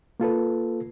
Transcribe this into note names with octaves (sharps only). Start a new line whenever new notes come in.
A#3 F4 A4 B4